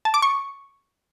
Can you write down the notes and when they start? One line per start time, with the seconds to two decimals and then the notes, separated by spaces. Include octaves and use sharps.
0.05 A5
0.14 D6
0.22 C#6